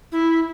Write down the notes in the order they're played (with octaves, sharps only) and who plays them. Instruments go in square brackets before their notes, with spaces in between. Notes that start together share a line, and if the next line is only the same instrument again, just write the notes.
[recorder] E4